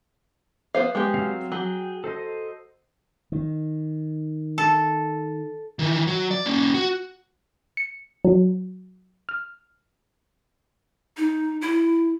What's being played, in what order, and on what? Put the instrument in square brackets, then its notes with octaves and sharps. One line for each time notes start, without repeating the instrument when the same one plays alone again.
[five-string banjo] B3 C5 F5
G#3 B3 G4
[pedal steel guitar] F#3 C4 F5
[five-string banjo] F#3 [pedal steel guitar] G#4 G5
[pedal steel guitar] A4 C5 D#5
[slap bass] D#3
[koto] A4
[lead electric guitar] D#3 E3
F#3
D5
A#3 C#4
F#4
[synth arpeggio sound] C#7
F#3
F6
[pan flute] D#4
E4